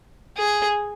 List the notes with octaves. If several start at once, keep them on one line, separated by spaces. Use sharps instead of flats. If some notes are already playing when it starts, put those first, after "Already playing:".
G#4